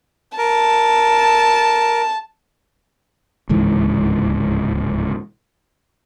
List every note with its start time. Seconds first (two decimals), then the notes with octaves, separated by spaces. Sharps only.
0.38 A#4 A5
3.49 D1 C#2 G#2 E3